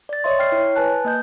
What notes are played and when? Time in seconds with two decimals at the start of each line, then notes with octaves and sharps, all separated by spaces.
0.09 D5 A6
0.24 C#5 D#5 E5 C6
0.39 G5 F6 C7
0.52 E4 C#5
0.76 B4 G#5 A5 F#6
1.05 A#3 D#5 G6